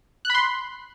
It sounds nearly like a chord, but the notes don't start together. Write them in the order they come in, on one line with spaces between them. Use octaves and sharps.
F#6 B5 C6